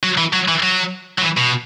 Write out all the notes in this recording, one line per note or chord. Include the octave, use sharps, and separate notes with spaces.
F#3
E3
F#3
E3
F#3
F#3
E3
B2